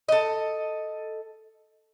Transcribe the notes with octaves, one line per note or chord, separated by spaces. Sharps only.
A4 D#5